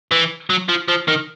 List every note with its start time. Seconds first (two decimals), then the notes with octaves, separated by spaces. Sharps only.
0.11 E3
0.50 F#3
0.69 F3
0.89 F3
1.08 D#3